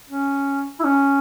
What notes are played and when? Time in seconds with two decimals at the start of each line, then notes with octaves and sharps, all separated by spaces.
0.10 C#4
0.80 E4
0.84 C#4